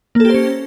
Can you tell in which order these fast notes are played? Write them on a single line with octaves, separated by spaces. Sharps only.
A#3 A4 G4 C5 C#4